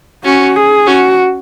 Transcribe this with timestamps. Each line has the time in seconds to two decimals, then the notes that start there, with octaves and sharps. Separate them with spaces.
0.24 C#4 F#4
0.56 G#4
0.87 C#4 F#4